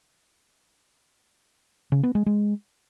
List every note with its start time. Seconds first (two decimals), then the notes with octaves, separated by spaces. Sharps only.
1.92 C#3
2.03 B3
2.15 G#3
2.26 G#3